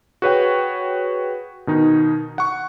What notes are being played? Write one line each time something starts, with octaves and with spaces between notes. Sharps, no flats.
F#4 G#4 B4 C#5 F#5 G5
B2 D#3 D#4
F#5 C#6